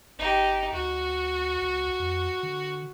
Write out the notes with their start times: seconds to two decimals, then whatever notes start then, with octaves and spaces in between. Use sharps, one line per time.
0.19 G1 D#4 G4
0.73 D2 F#4
1.62 C#2
2.00 F2
2.43 D3